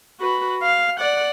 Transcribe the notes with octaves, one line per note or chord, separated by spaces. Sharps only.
F#4 B4
F5
D5 F#5